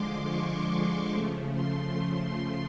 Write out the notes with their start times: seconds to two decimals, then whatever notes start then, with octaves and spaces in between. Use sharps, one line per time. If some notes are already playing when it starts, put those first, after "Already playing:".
Already playing: D3 F3 G#3 C6 D6
0.27 C#6
1.13 C#3 F3 A3
1.55 C6